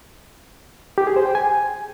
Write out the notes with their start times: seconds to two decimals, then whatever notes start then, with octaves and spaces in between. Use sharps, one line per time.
0.98 G4
1.07 G#4
1.16 C5
1.26 G5
1.35 G#5